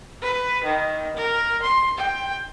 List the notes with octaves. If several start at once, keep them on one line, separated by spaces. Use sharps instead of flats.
B4
D#3
A#4
C6
G5